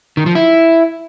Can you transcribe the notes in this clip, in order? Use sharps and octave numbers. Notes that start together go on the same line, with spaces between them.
D#3
F3
E4